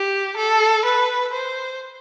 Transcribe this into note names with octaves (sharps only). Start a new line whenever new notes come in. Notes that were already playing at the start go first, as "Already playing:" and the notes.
Already playing: G4
A4
B4
C5